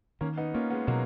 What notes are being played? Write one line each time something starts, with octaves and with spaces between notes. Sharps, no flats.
D#3 A#3 C#4
B3 D#4
A#3 C#4 F4
G#3 B3
B2 F#3 A#3